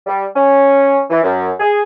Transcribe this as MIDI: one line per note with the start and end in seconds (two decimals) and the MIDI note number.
0.07 0.26 55
0.35 1.01 61
1.10 1.22 52
1.23 1.52 42
1.60 1.82 68